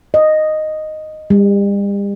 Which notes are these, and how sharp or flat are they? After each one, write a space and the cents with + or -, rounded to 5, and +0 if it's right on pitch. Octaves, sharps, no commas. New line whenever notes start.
D#5 -5
G3 +40